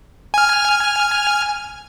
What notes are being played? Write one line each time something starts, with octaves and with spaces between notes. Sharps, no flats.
G#5 F6